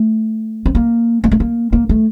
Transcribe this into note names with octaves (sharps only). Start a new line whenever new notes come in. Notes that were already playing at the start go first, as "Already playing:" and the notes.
Already playing: A3
C4
A#3
A#3
A3
A#3
A#3
A3